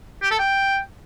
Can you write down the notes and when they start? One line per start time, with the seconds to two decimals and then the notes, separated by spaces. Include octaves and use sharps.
0.22 G4
0.31 A4
0.39 G5